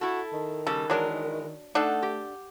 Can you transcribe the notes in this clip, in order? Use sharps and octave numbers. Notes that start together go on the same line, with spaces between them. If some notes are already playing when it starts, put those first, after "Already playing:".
E4 F#4 A4
D#3
C#3 G3 A4
E3 F#3 G#3 D4 A#4
A3 D4 D#4 A4 F#5
G4